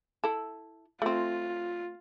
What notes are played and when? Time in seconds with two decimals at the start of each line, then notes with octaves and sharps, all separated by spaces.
0.24 E4 A4
1.02 A3 C4 F4